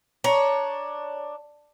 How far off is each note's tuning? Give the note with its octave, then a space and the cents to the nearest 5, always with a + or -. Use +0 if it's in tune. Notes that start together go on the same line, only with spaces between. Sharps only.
D4 +10 C#5 +10 A#5 +20